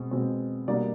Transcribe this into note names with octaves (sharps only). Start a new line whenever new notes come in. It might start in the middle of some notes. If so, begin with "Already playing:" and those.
Already playing: B2 G#3 C4
B2 G#3 C4
B2 G3 A#3 D4 D5